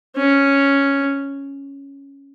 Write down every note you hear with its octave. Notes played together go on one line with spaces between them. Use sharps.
C#4